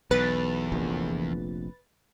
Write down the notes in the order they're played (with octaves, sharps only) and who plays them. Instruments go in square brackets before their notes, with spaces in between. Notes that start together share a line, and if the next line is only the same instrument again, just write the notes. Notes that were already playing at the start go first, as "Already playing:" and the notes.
[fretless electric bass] B1 [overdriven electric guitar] E2 [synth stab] B4 A6
[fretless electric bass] F1 A#1 F2